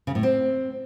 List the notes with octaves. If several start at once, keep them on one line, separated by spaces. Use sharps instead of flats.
C#3
A2
C4